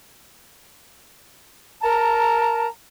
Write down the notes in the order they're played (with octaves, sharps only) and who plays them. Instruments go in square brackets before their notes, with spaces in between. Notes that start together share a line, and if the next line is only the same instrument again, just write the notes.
[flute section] A#4 A5 A#5